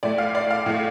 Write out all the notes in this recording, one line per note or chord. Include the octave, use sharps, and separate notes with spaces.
A2 A3 D5
F5
D5
F5
A2 A3